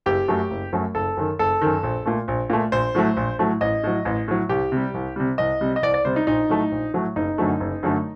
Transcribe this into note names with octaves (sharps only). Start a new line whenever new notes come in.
F#1 G4
F#2 F#3 A3
F#1
F#2 F#3 A3
F#1 A4
F#2 D#3
F#1 A4
F#2 D#3
A#1
A#2 A3
A#1
A#2 A3
A#1 C5
A2 F#3 A3
A#1
A2 F#3 A3
A1 D#5
A2 F#3
A1
A2 F#3
C2 G4
C3 G3
C2
C3 G3
C2 D#5
C3 G3
D#5
C2 D5
D5
C3 G3 C5
D#4
A#1 D#4
A2 F#3 A3
A#1
A2 F#3 A3
F#1 D#4
F#2 D3 F#3 A3
F#1
F#2 D3 F#3 A3